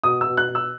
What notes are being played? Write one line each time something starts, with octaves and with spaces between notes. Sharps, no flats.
B2 D#6
E6
B2
F#6
B2
E6